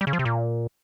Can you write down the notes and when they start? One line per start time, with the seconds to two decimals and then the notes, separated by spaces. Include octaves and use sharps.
0.01 G3
0.07 C#3
0.13 F3
0.19 C3
0.25 A#2